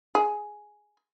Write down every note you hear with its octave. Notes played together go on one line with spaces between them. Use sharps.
G#4